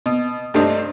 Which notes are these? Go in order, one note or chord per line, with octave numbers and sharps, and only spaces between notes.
B2
G2 C3 A3 C4 D4 D#4